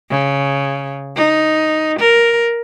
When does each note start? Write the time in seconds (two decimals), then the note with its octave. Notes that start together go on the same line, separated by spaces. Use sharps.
0.10 C#3
1.16 D#4
1.99 A#4